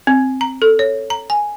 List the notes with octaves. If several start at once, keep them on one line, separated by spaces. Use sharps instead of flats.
C4
A#5
A4
C#5
A#5
G#5